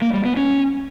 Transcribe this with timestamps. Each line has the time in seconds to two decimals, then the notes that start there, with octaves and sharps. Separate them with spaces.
0.02 A#3
0.13 G3
0.25 B3
0.37 C#4